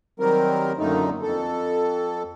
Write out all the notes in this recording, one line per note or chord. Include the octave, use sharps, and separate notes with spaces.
D#3 F#3 G3 C4 A#4
F#2 A#2 D3 D#3 A3 D#4
F2 A4